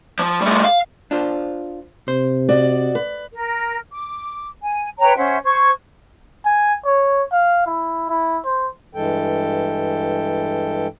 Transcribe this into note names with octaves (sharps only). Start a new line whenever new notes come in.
F3
G3 A3
F5
D4 F4 C5
C3 C5
F#4 D5 D#5
B4
A#4
D6
G#5
B4 C#5 G5 A#5
C#4 C5 E5 F#5
C5 C#6 G#6
G#5
C#5
F5
E4
E4
C5
G2 E3 G#3 A4 G5